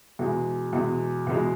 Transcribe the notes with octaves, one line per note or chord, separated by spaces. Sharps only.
E2 B2 G#3
E2 B2 G#3
E2 B2 G#3